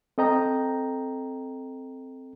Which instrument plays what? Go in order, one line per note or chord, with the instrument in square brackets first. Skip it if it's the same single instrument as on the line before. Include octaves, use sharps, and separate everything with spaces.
[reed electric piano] C4 A4 D#5 G5 A#5